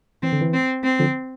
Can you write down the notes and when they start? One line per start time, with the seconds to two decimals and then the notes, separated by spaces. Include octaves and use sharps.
0.23 E3 C4
0.32 D3
0.41 E3
0.54 C4
0.84 C4
0.99 D3 F3